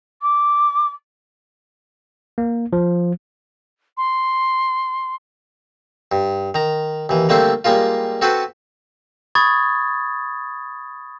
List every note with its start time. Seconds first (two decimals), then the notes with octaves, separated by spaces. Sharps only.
0.21 D6
2.38 A#3
2.73 F3
3.97 C6
6.12 G2
6.54 D#3 A#5
7.09 D#2 E3
7.29 D3 G3 A3 A#3 C4 C5
7.65 G3 G#3 A#3 F4
8.22 C4 F#4 A4 B4 C5
9.35 B5 C#6 D#6 G#6 A6